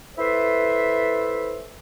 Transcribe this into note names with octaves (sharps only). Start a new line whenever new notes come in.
E4 A4 B4 C5 E5